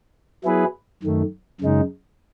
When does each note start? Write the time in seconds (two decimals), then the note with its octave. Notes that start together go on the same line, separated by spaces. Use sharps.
0.44 F#3 B3 E4 G#4 B4
1.03 F#2 D#3 A3
1.61 F#2 C#3 G#3 D#4